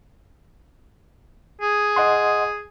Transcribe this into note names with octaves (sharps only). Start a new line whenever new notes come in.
G#4
D#5 F#5 C6